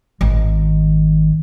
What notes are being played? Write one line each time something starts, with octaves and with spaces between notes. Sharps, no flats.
G#1 D#3